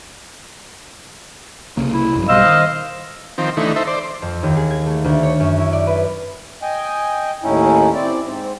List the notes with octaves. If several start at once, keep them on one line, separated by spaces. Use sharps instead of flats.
C2 C#3 A#3
E4
A#1 G2 F#3
B1 B2 G3 C5 D#5 F5 E6
D#3
D#3 F3 C4
D3 E3 A3 D#4
D#4 A4 C5 E5
C5 D5
F2
D#2
G#4
G#6
A3
D2
C#5
F#2
E4
D5
B4
D#5 G5 G#5
D#2 A2 C#4 D#4 E4
C4 E4 D5
G#2 C4